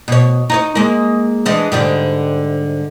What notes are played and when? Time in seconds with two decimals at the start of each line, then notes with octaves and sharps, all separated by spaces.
0.08 B2 C#5
0.50 D#4 C#5 D#5
0.75 G#3 A#3
1.46 E3 G#3 D4
1.72 G#2 D3 G3